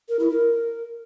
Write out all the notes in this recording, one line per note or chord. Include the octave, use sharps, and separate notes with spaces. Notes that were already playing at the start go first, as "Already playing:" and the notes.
A#4
E4
A#4